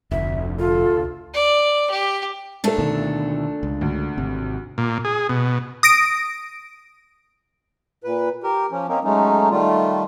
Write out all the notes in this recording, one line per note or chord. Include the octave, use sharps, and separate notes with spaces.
F1 D2 E5
F4 A4
D5
G4
A#2 A3 D4 A4 A5
D2 B2 D#3
C#2
D2
G#1 C3
A#2
G#4
B2
D#6 A#6 D7
A#2 B4
G4 A#4
F3 C#4
A#3 C4 C#4 D#4
F#3 G#3 A3 C#4 D#4
D#3 G3 A3 F4